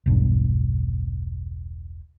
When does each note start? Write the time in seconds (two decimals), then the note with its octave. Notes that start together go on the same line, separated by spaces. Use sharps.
0.06 E1 B1 G2 D4